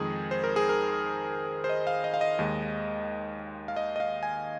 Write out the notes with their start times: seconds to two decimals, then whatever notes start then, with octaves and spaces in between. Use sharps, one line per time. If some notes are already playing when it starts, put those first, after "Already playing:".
Already playing: F2 D#3 G#3 G#4
0.31 C5
0.44 A#4
0.56 G#4
0.69 A#4
1.64 C5
1.69 D#5
1.87 F5
2.04 D#5
2.14 F5
2.21 D#5
2.39 D#2 D#3 G#3
3.68 F5
3.76 D#5
3.96 D#5
4.00 F5
4.23 G#5